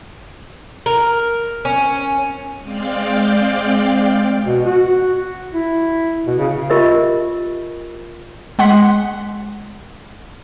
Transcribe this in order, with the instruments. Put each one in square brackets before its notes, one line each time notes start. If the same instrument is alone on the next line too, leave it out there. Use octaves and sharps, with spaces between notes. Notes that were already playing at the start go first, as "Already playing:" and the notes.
[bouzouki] A#4
C#4
[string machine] G#3 C4 D5 F5 G5
[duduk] B2
F#4
E4
B2
C#3
[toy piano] F4 G4 A#4 D#5 E5
[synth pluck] G#3 F#5 C6 B6